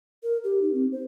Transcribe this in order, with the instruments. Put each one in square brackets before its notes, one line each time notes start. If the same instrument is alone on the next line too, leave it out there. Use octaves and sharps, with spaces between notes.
[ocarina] A#4
G4
D#4
C4
C5